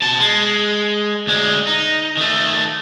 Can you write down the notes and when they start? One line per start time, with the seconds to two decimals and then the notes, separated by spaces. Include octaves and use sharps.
0.02 B2 A5
0.19 G#3
1.27 D2 G#3
1.67 D#4
2.17 D#3 A3